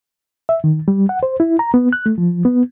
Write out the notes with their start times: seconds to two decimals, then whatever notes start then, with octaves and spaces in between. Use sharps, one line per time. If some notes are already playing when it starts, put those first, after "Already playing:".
0.49 E5
0.64 D#3
0.88 G3
1.09 F#5
1.23 C5
1.40 E4
1.59 A#5
1.74 B3
1.93 F#6
2.06 A3
2.18 F3
2.45 B3